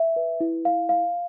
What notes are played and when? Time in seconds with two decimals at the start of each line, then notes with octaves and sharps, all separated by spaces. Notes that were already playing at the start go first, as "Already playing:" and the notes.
Already playing: E5
0.16 B4
0.40 E4
0.65 F5
0.89 F5